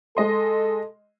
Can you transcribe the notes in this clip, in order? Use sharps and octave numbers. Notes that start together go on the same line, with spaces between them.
G#3 A4 D#5 C6